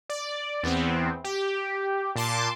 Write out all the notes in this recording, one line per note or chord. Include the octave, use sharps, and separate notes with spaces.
D5
E2 B3 C4
G4
A#2 A5 C6 D6